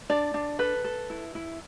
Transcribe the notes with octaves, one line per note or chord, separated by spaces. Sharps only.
D4 D5
D4
A4 B4
A4
E4
E4